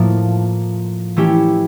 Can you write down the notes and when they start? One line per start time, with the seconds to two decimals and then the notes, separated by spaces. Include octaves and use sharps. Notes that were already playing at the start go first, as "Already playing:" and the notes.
Already playing: A2 F3 A#3
1.16 E3 A3 C#4 E4 G4